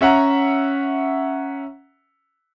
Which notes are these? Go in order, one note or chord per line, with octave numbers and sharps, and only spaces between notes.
C#4 E5 F#5 A#5